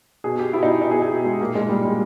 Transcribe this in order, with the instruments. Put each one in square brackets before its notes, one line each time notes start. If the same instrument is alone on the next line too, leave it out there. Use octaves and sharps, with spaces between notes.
[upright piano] B2 G#4
G4
B2 E4
D#4
B2 D#4
G#4
G#4
B2
G#3
A#2 A#3
G#3
A#2 G3
G#3